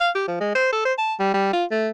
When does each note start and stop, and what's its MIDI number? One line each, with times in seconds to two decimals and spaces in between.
0.01 0.10 77
0.15 0.25 67
0.28 0.39 53
0.40 0.55 56
0.55 0.70 72
0.72 0.85 69
0.85 0.93 72
0.98 1.14 81
1.19 1.31 55
1.34 1.51 55
1.53 1.65 65
1.71 1.90 57